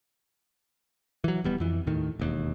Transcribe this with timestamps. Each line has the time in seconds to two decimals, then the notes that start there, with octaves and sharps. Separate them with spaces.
1.24 E3 F#3
1.44 D#1 G3 B3
1.60 F2 E3
1.87 D#2 A2 D#3
2.19 E1 D#2